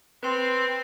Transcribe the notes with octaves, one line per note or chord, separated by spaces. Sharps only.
C4 B4 C6